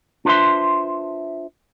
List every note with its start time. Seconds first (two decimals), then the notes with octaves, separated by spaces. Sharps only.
0.25 D4 F4 B4 C5 E5 C6